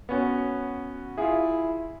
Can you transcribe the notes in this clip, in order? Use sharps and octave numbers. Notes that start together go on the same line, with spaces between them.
B3 C#4 F#4
E4 F4 G#4